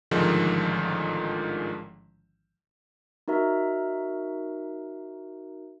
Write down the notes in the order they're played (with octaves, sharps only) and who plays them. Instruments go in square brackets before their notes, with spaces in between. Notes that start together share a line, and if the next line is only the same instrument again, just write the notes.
[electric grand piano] A1 G#2 D3 D#3 F3 G#3
[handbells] D#4 F#4 A#4 E5 A#5